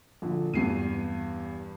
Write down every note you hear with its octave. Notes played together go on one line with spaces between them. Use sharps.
A#1 A#2 D3
E2 G2 C7 D#7